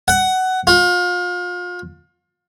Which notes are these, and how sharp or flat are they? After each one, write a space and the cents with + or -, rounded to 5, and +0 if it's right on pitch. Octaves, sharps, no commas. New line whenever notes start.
F#5 +15
F4 +35